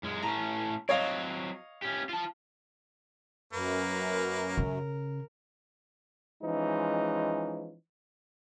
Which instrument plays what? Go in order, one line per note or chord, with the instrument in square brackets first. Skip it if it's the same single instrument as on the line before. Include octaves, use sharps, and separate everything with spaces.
[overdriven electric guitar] F#2 G#3
[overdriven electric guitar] A2 C#4 [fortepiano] A#5
[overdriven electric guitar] F#3 C4 [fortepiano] C#5 D#5 F5
[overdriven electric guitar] C#4 G4
F4 A5
[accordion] F#2 [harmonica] A#3 B4 [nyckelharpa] A#4
[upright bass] C#3
[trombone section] E3 F3 G#3 C#4 D#4